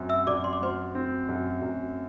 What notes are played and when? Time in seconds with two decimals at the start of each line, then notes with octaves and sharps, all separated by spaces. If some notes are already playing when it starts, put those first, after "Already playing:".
Already playing: F#2 F#3 C4
0.09 E5 E6
0.27 F#2 D5 D6
0.44 C6
0.53 D6
0.61 F#3 C5 C6
0.95 C4
1.29 F#2
1.62 F#2